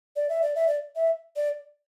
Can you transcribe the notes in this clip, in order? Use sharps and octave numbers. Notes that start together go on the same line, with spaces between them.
D5
E5
D5
E5
D5
E5
D5